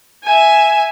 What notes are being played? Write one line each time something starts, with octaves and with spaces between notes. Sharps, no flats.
E5 G#5